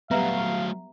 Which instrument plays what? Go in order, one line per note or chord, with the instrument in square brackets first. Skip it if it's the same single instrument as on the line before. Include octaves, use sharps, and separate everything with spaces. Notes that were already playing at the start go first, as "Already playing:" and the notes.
[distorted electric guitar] F#3 A3 [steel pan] G3 B3 [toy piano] E5 A#5 [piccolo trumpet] F5